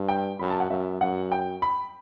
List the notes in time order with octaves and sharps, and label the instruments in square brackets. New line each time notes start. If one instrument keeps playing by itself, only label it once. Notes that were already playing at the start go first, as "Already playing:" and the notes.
Already playing: [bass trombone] G2
[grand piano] G5
[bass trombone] F#2 [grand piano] B5
[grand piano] A5
F#5
[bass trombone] F#2 [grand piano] E5
[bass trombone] F#2 [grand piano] F#5
[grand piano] G5
B5